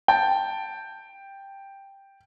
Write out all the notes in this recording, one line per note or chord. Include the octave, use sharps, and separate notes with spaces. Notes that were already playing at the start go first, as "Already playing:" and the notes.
G5 A5